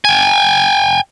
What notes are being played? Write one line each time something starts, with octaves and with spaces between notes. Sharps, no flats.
G5 G#5